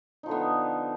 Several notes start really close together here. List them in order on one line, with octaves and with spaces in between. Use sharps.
D#4 F3 D3 B3